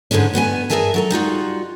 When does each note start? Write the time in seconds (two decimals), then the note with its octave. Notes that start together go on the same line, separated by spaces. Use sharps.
0.11 G#2 D3 E3 G#3 C#4
0.34 G2 B3 A4 G#5
0.70 G2 G#4 A#4 E5 G#5 A5
0.94 F#3 A4 A#5
1.10 G3 D#4 F4 F#4